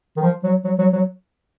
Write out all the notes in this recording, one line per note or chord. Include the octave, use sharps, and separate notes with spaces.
D#3
F3
F#3
F#3
F#3
F#3